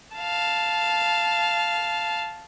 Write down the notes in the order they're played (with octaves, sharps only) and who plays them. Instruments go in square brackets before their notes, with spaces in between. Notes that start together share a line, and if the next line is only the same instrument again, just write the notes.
[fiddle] F5 A5